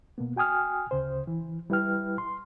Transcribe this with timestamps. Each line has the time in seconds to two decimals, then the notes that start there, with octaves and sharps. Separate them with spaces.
0.18 B2 A#3 B3
0.36 F#4 G5 G#5 D#6 F6
0.91 D2 C#3 C5
1.27 E3
1.70 G3 E4 B4 G5 F6
2.18 C6